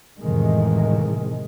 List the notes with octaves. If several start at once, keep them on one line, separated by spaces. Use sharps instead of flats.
F2 A2 C3 D#3 E3 G#3